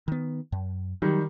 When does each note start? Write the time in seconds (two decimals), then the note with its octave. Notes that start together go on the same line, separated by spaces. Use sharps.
0.08 D#3 B3
0.52 F#2
1.02 D#3 F#3 G3